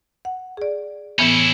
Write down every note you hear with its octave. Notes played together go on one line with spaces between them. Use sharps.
F#5
G#4 D5
A2 E3 B3 C#4 E4